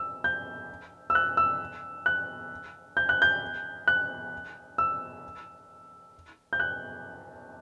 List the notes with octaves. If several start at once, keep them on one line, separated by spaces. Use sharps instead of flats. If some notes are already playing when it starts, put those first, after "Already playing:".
Already playing: E6
G6
E6
F#6
E6
F#6
G6
F#6
G6
F#6
E6
G6
F#6